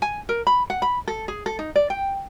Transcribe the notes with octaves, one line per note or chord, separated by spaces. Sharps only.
G#5
A#4
B5
F#5
B5
A4
G#4
A4
D#4
D5
G5